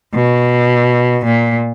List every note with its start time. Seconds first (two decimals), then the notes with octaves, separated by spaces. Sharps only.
0.14 B2
1.25 A#2